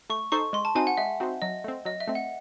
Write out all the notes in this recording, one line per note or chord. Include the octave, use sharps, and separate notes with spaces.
A3 C#6
D#4 A4 C5 C#6
G#3 C6
A5
C4 D#4 F#4 C5 G#5
F#5
G#3 E5
C4 D#4 F#4 C5
F#3 D#5
A3 C4
F#3 D#5
E5
A3 C4
F#5